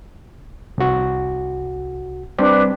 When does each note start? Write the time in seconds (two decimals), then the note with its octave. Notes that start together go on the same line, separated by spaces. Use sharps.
0.78 C2 F#4
2.39 G3 C4 D4 G4 B4